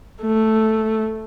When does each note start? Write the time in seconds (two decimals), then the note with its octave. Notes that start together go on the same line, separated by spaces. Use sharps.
0.21 A3